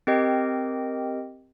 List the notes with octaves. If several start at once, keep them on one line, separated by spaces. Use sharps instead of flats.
C4 G4 A#4 D#5 G5